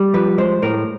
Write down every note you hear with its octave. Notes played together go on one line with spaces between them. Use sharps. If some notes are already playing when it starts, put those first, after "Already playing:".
Already playing: G3
F3 B4
G#3 C5
A2 A#4